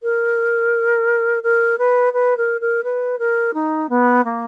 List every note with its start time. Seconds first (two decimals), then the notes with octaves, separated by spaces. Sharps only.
0.03 A#4
1.43 A#4
1.78 B4
2.13 B4
2.37 A#4
2.60 A#4
2.84 B4
3.18 A#4
3.54 D#4
3.89 B3
4.24 A#3